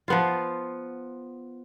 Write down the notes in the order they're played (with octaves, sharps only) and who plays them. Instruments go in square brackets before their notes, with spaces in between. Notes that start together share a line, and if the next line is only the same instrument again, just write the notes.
[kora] F3 B3 F4